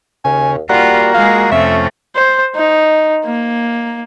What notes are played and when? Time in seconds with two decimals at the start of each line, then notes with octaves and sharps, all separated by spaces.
0.25 D#2 C#3 G#5
0.69 G3 A#3 F4 F#4 A#4 F#5
1.14 G#3 F4 G#4 F5
1.52 F2 C3 A3 C#4 E5
2.16 C5
2.56 D#4
3.25 A#3